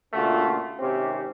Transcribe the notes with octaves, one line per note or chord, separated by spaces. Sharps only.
A#2 C#3 A3 D4 F4 F#4
G#1 C3 C4 C#4 G4